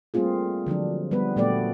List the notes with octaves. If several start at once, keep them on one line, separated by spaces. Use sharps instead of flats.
G3 A3 A#3 C4 F4 G#4
D3 F3 F#3 D4
G3 B3 B4
A#2 F#3 A3 B3 G4 D5